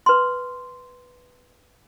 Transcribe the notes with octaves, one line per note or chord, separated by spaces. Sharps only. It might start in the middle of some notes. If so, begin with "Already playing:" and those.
B4 C6